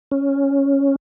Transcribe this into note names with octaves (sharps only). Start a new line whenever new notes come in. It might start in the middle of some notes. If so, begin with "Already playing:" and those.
C#4